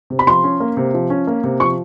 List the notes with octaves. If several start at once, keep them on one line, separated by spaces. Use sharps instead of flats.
C3
B5
F3 C6
C#4
A#3
C3
F3
C#4
A#3
C3
F3 C#6